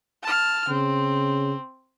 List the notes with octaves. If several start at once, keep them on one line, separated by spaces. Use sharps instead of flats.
A5 F6
C#3 C4